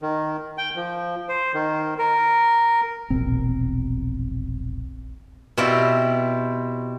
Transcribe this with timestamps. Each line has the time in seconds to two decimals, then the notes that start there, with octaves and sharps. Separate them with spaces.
0.02 D#3
0.58 G5
0.76 F3
1.29 C5
1.54 D#3
1.99 A#4
3.10 E1 A#1 B2 C4
5.58 B2 C4 E4 F4 G4 D5